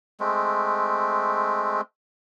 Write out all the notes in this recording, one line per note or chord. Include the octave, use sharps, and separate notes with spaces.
G#3 A3 C4